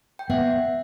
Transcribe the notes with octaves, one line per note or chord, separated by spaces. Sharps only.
G5
B3 E5 F#5